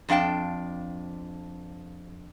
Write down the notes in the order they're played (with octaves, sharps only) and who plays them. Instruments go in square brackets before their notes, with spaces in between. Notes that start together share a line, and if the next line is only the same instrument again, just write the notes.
[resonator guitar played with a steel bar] F2 D4 F5 G5 A5